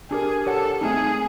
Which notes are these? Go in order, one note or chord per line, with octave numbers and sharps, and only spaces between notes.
D4 G4 G#4 A#4
G4 A4 A#4 C#5 F#5
A3 C4 D#4 G#4